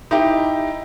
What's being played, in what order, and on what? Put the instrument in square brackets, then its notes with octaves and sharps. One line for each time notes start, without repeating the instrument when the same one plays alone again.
[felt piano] D#4 E4 G4